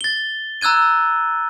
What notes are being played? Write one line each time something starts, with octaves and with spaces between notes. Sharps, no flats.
A6 G7
A#5 E6 F#6 G#6 D#7